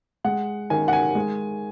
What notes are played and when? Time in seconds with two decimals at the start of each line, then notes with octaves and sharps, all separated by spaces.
0.25 G#3 F#5
0.70 D#3 G#5
0.88 F#5
0.93 G#5
1.15 G#3